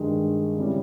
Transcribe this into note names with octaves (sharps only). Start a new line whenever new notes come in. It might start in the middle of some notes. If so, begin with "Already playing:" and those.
Already playing: G2 D#3 G#3
C#3 G3 C#4 E4